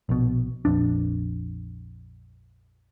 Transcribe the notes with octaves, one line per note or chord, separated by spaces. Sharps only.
A#1 B2
A#1 F2 D4